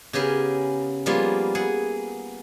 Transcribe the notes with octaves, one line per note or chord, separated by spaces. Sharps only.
C#3 B3 G4 G#4 A#4
F3 G3 A#3 B3 F4 G#4
G#4 F#5